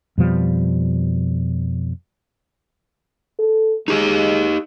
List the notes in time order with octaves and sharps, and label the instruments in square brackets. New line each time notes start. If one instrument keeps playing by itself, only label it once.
[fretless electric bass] F2 B2 F3 G3
[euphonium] A4
[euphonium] G#3 [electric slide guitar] D#4 G4 D#5